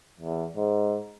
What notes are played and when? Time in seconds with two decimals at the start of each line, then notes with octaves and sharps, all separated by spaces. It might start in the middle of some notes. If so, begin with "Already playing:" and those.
0.20 E2
0.57 G#2